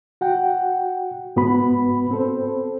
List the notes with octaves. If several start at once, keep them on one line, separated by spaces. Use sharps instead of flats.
F#4 F#5 G5
G#2 B3 F#4 B4 B5
C4 A4 C5